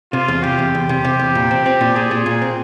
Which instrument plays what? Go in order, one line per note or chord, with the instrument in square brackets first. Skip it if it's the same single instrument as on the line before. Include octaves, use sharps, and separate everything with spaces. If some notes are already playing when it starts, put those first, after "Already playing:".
[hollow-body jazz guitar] C3 [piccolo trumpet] F4
[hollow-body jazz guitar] E2
[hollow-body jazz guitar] C3 [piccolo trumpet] G4
[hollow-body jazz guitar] E2
E2
C3
C3
E2
A#2
C4
C4
A#2
[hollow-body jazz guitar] A#2 [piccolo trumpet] G#4
[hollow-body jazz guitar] A#2
A#2
C4